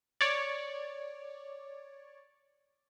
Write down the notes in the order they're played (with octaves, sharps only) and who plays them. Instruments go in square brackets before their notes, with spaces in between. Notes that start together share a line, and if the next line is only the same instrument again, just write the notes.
[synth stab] C#5 D5